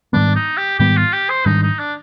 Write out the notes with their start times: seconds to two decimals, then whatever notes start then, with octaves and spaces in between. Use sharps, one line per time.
0.13 G#2 D#3 G3 B3 D4
0.35 D#4
0.57 G4
0.79 G#2 D#3 G3 B3 G4
0.97 F4
1.13 G4
1.30 C5
1.46 G#2 D#3 G3 D4 D#4
1.63 D#4
1.79 D4